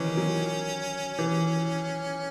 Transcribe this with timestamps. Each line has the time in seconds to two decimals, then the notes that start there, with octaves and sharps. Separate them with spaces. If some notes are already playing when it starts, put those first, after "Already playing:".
Already playing: D#3 E3 C#4
0.17 F#3
1.19 E3